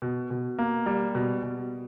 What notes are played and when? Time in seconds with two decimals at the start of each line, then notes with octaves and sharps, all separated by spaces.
0.02 B2
0.30 B2
0.58 A#3
0.86 G3
1.15 B2
1.43 B2